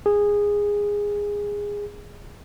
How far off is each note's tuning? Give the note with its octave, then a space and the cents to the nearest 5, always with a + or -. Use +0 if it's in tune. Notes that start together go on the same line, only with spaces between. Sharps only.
G#4 -15